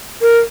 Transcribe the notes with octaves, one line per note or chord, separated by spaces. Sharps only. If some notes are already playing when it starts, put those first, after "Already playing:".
A#4